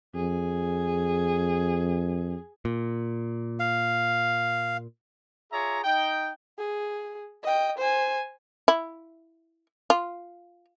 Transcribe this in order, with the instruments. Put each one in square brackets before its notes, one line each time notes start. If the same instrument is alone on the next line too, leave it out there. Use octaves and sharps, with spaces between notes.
[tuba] F2 [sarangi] G#4
[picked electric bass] A#2
[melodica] F5
[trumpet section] F4 G#4 C#5 E5 A#5
D#4 G5
[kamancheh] G#4
D#5 G5
C5 G#5
[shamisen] E4
F4